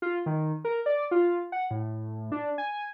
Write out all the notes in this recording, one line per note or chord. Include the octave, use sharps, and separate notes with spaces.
F4
D#3
A#4
D5
F4
F#5
A2
D4
G#5